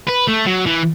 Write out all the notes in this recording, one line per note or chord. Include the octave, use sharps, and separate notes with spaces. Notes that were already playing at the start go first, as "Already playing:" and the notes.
B4
A3
F#3
E3